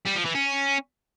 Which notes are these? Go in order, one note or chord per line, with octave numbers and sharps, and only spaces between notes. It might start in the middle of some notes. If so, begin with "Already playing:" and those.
G3
F3
E3
C#4